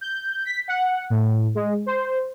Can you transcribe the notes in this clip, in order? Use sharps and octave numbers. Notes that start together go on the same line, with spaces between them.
G6
B6
F#5
A2
G#3
C5